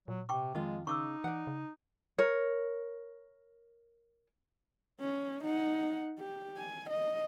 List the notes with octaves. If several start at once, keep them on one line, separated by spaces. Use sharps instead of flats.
A#2 F#3
C3 G5 C#6 D6
F2 D#3 G#3 F4 D#5
C#3 D#4 C#6 D6 E6
E3 D5 F#5
C#3
A#4 C#5
C#4
D#4 F#5
G4
G#5
D#5